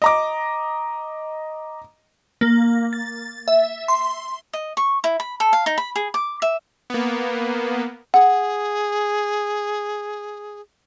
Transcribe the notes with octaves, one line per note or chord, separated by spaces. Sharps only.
D#5 A#5 D6
A#3
A6
E5
C6
D#5
C#6
E4
B5
A4
F5
D#4
B5
G#4
D6
E5
A#3 B3
G#4 F#5